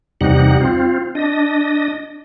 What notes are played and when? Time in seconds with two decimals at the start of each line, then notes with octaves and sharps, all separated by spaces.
0.21 E2 C3 G3 D#4 F#5
0.60 C4 F4
1.15 D4 D#5